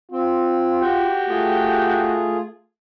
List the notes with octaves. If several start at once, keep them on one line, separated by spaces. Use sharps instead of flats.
C4 F4
F#4 G4 G5
A3 F4 G#4